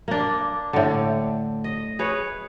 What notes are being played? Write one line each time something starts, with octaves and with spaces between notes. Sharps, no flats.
A#3 D4
A2 D3
D#5
G#4 B4 C#5